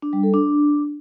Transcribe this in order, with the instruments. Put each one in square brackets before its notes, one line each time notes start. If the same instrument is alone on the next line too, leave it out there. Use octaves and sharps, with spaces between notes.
[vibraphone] D4
G3
A4
D4